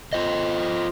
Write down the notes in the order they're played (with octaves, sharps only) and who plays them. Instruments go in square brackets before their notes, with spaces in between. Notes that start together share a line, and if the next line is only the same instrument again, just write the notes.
[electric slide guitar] F4 C5 D#5